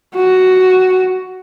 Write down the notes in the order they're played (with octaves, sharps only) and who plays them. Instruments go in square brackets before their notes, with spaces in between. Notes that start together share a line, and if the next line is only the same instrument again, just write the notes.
[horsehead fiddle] F#4